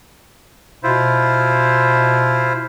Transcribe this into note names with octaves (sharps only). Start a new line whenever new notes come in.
B2 E4 F4 C5